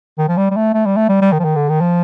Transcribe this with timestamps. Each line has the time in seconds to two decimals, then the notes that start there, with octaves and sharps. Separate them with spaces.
0.18 D#3
0.28 F3
0.37 G3
0.51 G3
0.56 A3
0.74 A3
0.86 G3
0.97 A3
1.09 G3
1.21 G3
1.32 D#3
1.39 F3
1.44 D#3
1.56 D3
1.69 D#3
1.81 F3